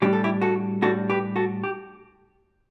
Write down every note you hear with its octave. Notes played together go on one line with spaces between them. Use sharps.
A2 G3 D4 G4
A4
E4 G4
F#4 A4
A2 G3 D4 F#4 A4
G4 B4
F#4 A4
G4